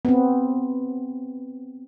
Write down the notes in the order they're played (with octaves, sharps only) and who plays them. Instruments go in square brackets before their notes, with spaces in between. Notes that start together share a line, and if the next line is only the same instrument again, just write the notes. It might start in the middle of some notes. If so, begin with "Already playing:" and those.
[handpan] B3 C4